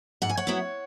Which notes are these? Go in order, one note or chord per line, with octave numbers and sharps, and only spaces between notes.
G#2 F#5
G#5
C#5 F#5
F#3 B3 E4